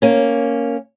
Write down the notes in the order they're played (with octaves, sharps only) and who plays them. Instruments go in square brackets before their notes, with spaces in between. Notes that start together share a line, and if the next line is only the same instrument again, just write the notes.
[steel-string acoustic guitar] A#3 C#4